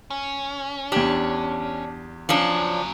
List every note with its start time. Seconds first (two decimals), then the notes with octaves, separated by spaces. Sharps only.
0.10 C#4
0.92 E2 D4 G4
2.29 C#3 F3 F#3 C#4 D4